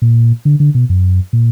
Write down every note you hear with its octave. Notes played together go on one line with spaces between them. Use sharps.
A#2
D3
D3
B2
F#2
A#2